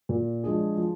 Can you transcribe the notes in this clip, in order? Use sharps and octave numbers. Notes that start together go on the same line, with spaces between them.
A#2
F3 G#3 D4 G#4
F3